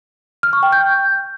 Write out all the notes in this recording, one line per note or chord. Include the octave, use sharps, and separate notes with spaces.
F6
C#6
G5
G6